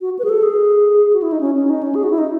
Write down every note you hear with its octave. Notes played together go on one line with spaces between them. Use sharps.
F#4
B4
G#4
A4
G#4
F#4
E4
D#4
C#4
C#4
D#4
C#4
G#4
F#4
E4
D#4